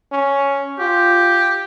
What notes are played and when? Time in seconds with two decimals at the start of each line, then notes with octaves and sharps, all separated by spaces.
0.12 C#4
0.79 F4 G4